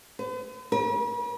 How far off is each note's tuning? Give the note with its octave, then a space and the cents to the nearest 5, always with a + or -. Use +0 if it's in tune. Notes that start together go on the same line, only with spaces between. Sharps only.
B4 +45
B4 -45